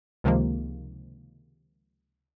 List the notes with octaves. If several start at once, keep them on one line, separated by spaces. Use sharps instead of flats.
C#2 C3 D#3 F3 G#3 A#3